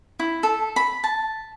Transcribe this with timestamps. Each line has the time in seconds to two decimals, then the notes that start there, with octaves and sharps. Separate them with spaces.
0.19 E4
0.43 A4
0.76 B5
1.04 A5